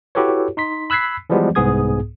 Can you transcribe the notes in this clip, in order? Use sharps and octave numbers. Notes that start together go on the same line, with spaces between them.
E4 F#4 G4 A4 B4 C#5
D#4 C6 B6
B5 E6 F#6 G#6 B6 C7
E3 F3 G3 G#3 B3
C2 G#2 B3 G#4 D#6 G#6